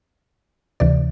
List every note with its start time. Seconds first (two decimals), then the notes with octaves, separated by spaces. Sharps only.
0.80 D2 C3 E3 D5